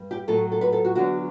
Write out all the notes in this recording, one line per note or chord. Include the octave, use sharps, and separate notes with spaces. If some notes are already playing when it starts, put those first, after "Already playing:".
Already playing: G2
G4
A2 F#3 A4
A4
B4
A4
F#4
E2 D3 F#3 F#4